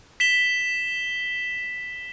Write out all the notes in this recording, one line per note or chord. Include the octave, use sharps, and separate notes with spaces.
B6 E7 G7